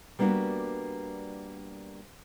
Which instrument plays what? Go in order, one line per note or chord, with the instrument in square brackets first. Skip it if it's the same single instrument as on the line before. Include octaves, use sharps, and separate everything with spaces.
[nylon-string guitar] G3 A#3 B3 D4 F#4